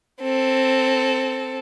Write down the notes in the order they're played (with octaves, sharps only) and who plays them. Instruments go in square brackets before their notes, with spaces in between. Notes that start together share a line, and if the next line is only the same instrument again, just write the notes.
[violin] C4 A4